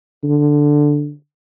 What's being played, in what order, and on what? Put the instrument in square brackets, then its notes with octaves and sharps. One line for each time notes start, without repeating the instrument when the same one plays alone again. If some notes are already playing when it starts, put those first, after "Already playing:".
[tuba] D3